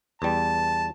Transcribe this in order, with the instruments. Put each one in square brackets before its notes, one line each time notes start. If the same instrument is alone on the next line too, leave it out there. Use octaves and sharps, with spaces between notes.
[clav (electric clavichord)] E2 G3 [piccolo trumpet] A5